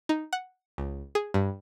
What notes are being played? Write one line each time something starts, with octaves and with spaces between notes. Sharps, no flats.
D#4
F#5
C#2
G#4
G2